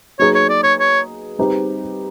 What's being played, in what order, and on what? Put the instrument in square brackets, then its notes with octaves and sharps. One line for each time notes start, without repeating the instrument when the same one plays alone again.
[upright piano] F#3 A#3 D#4 G#4 B4 [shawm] C#5
[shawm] C#5
D5
C#5
C#5
[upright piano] G3 C4 D#4 G4 B4